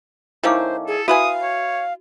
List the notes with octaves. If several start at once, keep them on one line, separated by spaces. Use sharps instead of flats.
D#3 A3 C#4 E4 C5 F5 D6
G#4 A4
E4 F#4 B4 F5 G#5 D#6
C#5